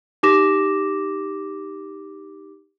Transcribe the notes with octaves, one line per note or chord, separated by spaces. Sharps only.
D#4 G4 D6 A#6 E7